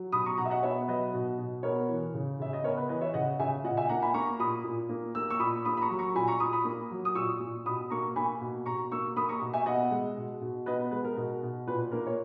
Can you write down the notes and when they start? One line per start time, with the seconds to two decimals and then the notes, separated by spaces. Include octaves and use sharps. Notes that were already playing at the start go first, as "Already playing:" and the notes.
Already playing: F#3
0.12 B2 B5 D#6
0.26 A#5 C#6
0.38 B2 F#5 A#5
0.45 E5
0.50 D#5 F#5
0.63 B3 C#5 E5
0.88 F#3 B4 D#5
1.14 B2
1.38 B2
1.63 B3 A#4 C#5
1.89 E3
2.14 C#3
2.39 C#3 E5
2.53 D#5
2.63 B3 A#4 C#5
2.77 B4
2.89 E3 B4 D#5
3.01 C#5 E5
3.14 C#3 D#5 F#5
3.39 C#3 E5 G#5
3.64 A#2 D#5 F#5
3.77 E5 G#5
3.89 A#3 F#5 A#5
4.02 G#5 B5
4.14 A#3 A#5 C#6
4.39 A#2 B5 D#6
4.64 A#2
4.89 A#3
5.15 A#3 E6
5.30 C#6 E6
5.39 A#2 B5 D#6
5.65 A#3 B5 D#6
5.77 B5
5.81 A#5 C#6
5.90 F#3
5.99 A#5 C#6
6.15 A#2 G#5 B5
6.28 A#5 C#6
6.40 A#2 B5 D#6
6.53 B5 D#6
6.65 A#3
6.91 F#3
7.05 D#6
7.15 A#2 C#6 E6
7.40 A#2
7.66 B2 B5 D#6
7.90 A#3 A#5 C#6
8.16 A#3 G#5 B5
8.41 B2
8.65 B2 A#5 C#6
8.91 A#3 C#6 E6
9.16 A#3 B5 D#6
9.29 A#5 C#6
9.41 B2
9.54 E5 G#5
9.66 B3 D#5 F#5
9.91 G#3
10.17 B2
10.41 B2
10.66 B3 B4 D#5
10.80 B4
10.91 G#3 B4
11.04 A#4
11.16 B2
11.43 B2
11.67 A#2 B4
11.92 A#3 A#4
12.07 C#5